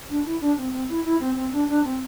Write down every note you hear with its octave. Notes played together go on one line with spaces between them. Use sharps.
D4
E4
D4
C4
C4
E4
E4
C4
C4
D4
D4
C4